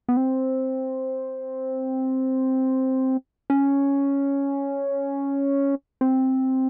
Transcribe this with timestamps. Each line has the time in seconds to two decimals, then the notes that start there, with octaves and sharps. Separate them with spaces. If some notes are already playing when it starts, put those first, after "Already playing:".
0.09 B3
0.17 C4
3.50 C#4
6.01 C4